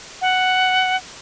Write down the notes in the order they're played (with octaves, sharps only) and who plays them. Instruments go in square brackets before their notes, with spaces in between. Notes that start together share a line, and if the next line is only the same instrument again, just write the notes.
[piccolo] F#5